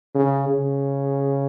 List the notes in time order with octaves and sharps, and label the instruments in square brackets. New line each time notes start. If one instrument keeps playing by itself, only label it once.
[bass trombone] C#3
C#3